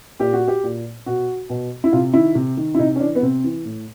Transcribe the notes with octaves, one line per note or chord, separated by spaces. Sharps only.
A#2 G4
F#4
G4
A#2
B2 F#4
B2
E4
C3 F4
D#3 E4
C3
D#3
E4
C3 D#4
C#4
E3 D4
B3
C3 C4
E3
A2